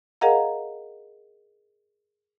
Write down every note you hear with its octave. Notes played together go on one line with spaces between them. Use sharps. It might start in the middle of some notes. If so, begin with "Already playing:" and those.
G#4 A#4 D#5 F5 F#5 A#5